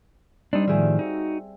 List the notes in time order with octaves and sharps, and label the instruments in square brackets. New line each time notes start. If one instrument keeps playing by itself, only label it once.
[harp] G3 C4 [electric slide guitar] D4 D#4
[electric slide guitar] A2 D#3 F3 [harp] G#4 E5
[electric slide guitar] D#4 F#4